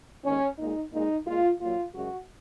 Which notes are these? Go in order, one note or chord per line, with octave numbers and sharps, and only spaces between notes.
D#2 D#3 G#3 C#4
A#2 G#3 D#4
A#2 G#3 D#4
A#2 G#3 F4
A#2 F#3 F4
F#2 C#3 G#3 F#4